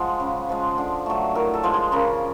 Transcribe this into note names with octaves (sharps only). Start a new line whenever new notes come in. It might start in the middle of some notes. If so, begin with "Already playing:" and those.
Already playing: F3 G#3 F#5
C#3
F3 G#3
D3
F#3 A3
A2 A#4
A4
F3 G#3
G#4
C#3 A#4